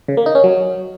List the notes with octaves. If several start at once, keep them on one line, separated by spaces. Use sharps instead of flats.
C#3
A#3
D#4
C#4
F#3